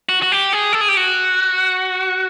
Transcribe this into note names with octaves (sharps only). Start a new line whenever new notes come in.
F#4
F#4
G4
G#4
A4
G#4
G4
F#4